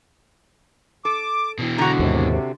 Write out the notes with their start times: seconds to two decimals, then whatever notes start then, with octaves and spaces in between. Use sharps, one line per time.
1.05 A4 D6
1.59 B2 E3
1.78 D3 F#4 A#5
1.99 D#2 G#2 C3